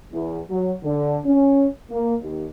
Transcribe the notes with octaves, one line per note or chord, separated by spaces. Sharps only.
E2
F#3
D3
C#4
A#3
D#2